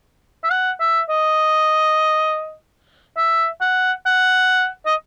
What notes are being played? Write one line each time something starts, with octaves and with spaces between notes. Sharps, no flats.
E5
F#5
E5
D#5
E5
F#5
F#5
D#5